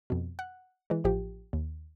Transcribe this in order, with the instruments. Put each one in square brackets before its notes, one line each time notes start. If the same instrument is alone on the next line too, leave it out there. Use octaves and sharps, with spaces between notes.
[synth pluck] F2 B2
F#5
E3 G#3
A1 F3 G4
D#2